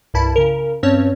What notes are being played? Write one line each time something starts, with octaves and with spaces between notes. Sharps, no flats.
C2 G2 E4 A5 B5
C#3 A#4
G2 C4 C#4 C#5 A5